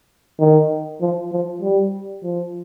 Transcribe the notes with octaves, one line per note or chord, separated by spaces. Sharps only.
D#3
F3
F3
G3
F3